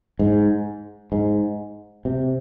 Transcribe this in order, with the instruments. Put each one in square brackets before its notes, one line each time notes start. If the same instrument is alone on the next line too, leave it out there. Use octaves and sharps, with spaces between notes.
[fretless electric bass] G#2
G#2
C3